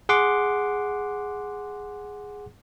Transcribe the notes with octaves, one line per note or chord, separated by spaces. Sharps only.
G#4 F#5 C6 D6